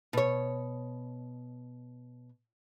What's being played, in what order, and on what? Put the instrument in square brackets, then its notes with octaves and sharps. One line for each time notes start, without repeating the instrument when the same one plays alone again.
[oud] B2 C#5